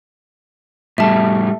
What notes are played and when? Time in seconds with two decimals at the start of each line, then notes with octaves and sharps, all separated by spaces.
0.98 A2 G3 A3 E5 A5